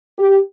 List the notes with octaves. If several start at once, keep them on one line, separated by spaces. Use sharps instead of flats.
G4